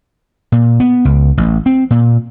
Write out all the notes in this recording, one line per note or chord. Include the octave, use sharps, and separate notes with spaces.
A#2
B3
C#2
A1
C4
A#2